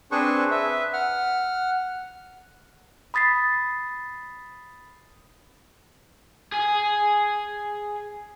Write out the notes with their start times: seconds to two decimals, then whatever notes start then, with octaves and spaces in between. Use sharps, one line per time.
0.11 C4 D4 G#4 B4 C5 C#6
0.51 B4 E5
0.93 F#5 F6
3.14 B5 D#6 A6 B6 C7
6.52 G#4 G#5